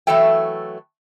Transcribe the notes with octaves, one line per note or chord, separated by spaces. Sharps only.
E3 F#3 A3 A4 E5 G5